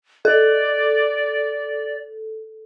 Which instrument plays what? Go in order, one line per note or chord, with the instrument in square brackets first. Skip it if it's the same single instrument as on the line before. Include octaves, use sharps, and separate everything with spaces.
[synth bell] A4 [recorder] D5